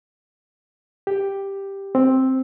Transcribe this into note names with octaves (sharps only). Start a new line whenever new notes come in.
G4
C4